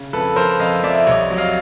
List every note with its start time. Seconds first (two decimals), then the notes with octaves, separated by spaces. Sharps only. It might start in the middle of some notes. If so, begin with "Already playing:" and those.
Already playing: C#3
0.13 F2 A4 B4
0.36 F3 A#4 C5
0.60 F2 D#5 F5
0.83 F2 D5 E5
1.07 C2 C#5 D#5
1.30 F#3
1.38 D#5 F5